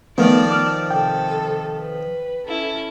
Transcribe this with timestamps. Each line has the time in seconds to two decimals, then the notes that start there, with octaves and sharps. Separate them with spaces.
0.18 D#3 F3 A3 B3 D5 A5
0.51 D6 F6
0.91 C3 A4 G5
1.78 B4
2.46 C#4 E4 A4